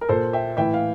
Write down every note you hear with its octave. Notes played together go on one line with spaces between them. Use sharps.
A#4
A#2 A4 C5
E5 G5
A2 E3 E5 G5
F5